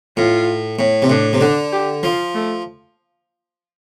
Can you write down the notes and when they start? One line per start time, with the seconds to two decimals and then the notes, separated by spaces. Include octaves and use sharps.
0.17 A2 F4
0.79 A2
1.02 C3
1.10 A2 D4
1.33 C3
1.41 D3 D4
1.73 G4
2.03 F3 F4
2.35 A3